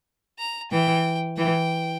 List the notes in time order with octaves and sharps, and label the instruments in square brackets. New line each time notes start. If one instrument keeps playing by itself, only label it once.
[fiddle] A#5
[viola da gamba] E3 [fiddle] G5
[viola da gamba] E3 [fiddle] G5